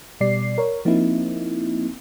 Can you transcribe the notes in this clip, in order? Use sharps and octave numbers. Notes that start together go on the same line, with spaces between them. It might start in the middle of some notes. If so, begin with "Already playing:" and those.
B2 G3 D5 C7
A#4 C#5
F3 A#3 C4 D#4 E4